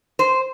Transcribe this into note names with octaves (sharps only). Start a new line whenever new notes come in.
C5